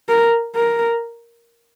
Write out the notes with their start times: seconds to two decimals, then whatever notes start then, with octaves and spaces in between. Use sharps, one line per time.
0.09 A#4
0.56 A#4